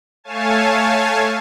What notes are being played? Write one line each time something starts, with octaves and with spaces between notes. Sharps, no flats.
A3 C#5 F5 G#5 A5